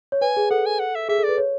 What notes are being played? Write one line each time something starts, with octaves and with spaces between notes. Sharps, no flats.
C#5
B4 G#5
G#4
A4 F#5
G#5
F#5
E5
G#4 E5
A4
B4 D5
C#5